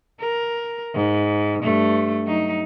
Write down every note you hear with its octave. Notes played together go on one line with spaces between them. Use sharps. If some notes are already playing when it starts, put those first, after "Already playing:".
A#4
G#2
G2 A3
F#3 D#4